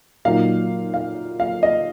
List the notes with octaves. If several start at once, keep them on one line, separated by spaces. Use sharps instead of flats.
A#2 F#3 A#3 D#4 F5
F5
F5
D#5